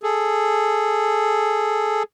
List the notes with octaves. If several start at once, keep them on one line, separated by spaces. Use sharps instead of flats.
G#4 A4